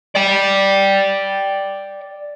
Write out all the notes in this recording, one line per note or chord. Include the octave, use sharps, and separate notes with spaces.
D5 G5